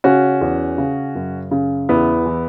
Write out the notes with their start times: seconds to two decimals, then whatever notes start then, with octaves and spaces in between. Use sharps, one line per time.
0.04 C#3 C#4 F#4
0.41 E2
0.78 C#3
1.15 F#2
1.51 C#3
1.89 E2 B3 E4
2.26 E3